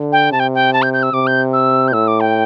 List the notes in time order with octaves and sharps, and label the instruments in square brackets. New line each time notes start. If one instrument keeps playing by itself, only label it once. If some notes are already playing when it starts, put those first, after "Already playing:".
Already playing: [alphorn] D3
[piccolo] G5
[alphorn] C3 [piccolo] A5
[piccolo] G5
G5
A5
G6
G6
E6
[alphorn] C3 [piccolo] D6
[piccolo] G6
E6
G6
[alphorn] A2 [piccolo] E6
[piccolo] D6
G5